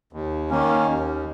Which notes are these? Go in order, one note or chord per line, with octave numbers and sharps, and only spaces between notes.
D#2
D#3 A#3 C#4
D#2